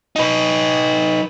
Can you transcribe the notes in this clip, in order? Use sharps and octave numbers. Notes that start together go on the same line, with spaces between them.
D#4 B4